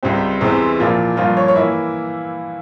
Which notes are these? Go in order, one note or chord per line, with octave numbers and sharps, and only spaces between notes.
C#2 C3 G3 C4
E2 C3 E3 G#3 C4
A#2 F3 A#3 E4
G2 F3 A#3 F4
C#5
C#5
E3 A#3 E4 E5